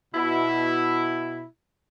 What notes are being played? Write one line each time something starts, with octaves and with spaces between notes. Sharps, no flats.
B2 E4